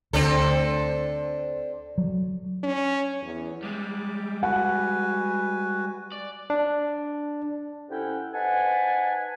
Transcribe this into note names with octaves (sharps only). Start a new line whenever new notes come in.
D2 C4 D4 A4
F#3
C#4
E2
G3 G#3 D6
F#4 B4 F#5 G#5
D5
D4
C3 C#4 E4 A4 F#5 G5
D#4 B4 C5 F#5 G#5 A5